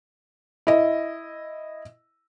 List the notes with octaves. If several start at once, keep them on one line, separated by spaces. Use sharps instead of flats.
E4 D#5